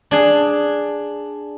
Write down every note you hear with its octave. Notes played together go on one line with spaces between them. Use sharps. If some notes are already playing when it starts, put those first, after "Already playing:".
D4 G#4